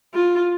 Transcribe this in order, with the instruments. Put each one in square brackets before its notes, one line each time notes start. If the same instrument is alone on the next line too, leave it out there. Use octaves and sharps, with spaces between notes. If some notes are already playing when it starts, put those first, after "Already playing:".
[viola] F4